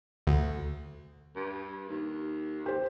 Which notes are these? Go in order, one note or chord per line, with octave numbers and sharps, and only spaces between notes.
D2
G2
D#2
G4 C5